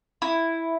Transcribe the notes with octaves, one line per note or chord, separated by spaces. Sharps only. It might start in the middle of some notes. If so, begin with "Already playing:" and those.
E4